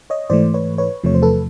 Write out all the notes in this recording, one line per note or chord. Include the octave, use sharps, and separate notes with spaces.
C#5 D#5
G#2 E3 A3 C5 D5
B4 C#5
B4 C#5
E2 C3 F3 A3 C#5
C5
A4 B4